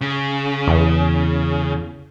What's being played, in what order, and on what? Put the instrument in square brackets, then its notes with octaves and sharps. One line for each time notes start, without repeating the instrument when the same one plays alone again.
[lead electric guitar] C#3
[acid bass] E2